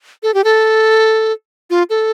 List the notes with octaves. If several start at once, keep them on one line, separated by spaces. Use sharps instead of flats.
A4
G4
A4
F4
A4